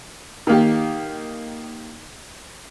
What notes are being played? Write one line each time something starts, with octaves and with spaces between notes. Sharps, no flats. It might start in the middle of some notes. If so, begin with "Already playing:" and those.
D#3 A#3 G4